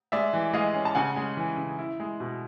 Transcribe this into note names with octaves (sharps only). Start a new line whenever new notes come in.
G#3 D5 E5
E3
G#3 D#5 F5
C#4
A5
C#3 F#5 G#5
G#3
E3
C#3
E4
G#3
B2